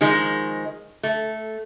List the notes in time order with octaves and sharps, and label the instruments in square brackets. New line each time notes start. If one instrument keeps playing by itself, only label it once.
[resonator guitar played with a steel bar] D#3 F3 G#3
A3